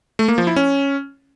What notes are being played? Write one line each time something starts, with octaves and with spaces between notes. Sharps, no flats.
A3
A#3
F3
E4
C#4